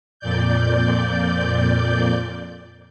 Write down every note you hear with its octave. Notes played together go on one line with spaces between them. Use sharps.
F2 A#2 D5 G6